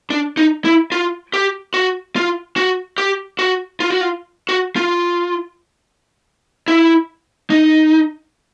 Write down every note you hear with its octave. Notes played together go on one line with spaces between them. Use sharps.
D4
D#4
E4
F4
G4
F#4
F4
F#4
G4
F#4
F4
F#4
F4
F#4
F4
E4
D#4